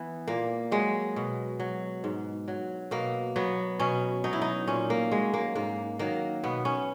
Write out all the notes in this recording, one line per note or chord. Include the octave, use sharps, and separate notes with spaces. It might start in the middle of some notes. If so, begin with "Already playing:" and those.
Already playing: E3 B3
A#2 A#3
F#3 G#3
B2
F#3
G#2
F#3
B2 A#3
F#3 B3
B2 C#4
F#3 D#4
E4
D#4
A#2 C#4
A#3
F#3 G#3
A#3
G#2 A#3
D#3 F#3 A#3
B2 B3
C#4